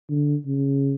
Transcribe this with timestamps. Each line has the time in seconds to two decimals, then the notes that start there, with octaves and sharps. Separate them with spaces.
0.10 D3
0.46 C#3